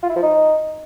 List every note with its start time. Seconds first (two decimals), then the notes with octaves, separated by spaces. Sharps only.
0.03 F4
0.09 E4
0.16 F3
0.23 D#4